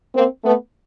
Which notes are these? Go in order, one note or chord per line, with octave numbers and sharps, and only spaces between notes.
A#3 C4
A3 B3